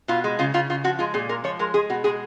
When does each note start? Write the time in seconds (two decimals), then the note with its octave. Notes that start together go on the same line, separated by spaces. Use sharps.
0.08 B2 F4
0.24 G#3
0.39 C#3 F4
0.54 C#3 F4
0.70 C#3 F4
0.84 F3 F#4
0.99 G#3 F4
1.14 A#2 G#4
1.29 G#3 A#4
1.44 F3 C#5
1.59 G#3 A#4
1.74 G#3 G#4
1.90 B2 F#4
2.04 G#3 G#4